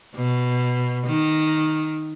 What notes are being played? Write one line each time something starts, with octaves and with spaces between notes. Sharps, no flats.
B2
D#3